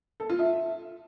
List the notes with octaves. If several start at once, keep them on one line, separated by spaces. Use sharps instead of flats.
A4
F4
E5